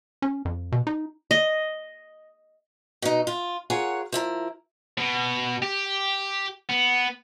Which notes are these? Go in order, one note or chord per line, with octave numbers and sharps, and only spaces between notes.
C#4
F2
B2
D#4
D#5
B2 D#4
F4
F4 G#4 A#4 C#5 F#5
F3 E4 A#4
B2
G4
B3